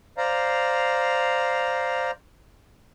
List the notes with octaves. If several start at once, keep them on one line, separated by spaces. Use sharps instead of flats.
C5 D5 F5 A#5